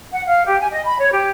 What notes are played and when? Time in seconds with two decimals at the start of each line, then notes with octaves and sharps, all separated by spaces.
0.12 F#5
0.27 F5
0.46 G4
0.60 G#5
0.72 D#5
0.85 B5
0.99 C#5
1.12 G4